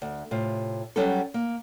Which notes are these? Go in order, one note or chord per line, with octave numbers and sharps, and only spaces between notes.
D2
A2 C3 F4
F#3 G3 C#4 F#4 A4
A#3